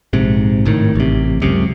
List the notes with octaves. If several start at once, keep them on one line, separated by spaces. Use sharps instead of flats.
A#1 G#2 C3
G#1 A2 D#3
A1 C3
C#2 F#2 C3